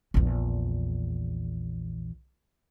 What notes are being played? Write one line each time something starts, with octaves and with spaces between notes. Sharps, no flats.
A#1 E2